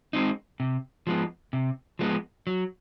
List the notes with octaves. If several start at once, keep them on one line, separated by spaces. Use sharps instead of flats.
G#3 C4 D#4
C3
F3 G#3 B3
C3
F3 G#3 B3
F#3